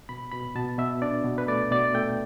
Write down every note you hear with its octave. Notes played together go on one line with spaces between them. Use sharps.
B2 B5
B2 B5
B2 A5
B2 E5
D4 D5
B2
B4
A3 D5
B2 D5
A3 G5